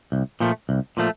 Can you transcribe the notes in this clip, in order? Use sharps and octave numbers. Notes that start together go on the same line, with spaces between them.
C2
A#2 F3 A3
C2
A#2 F3 A3